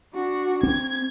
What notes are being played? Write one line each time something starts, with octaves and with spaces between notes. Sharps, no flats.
D4 F#4
C4 G#6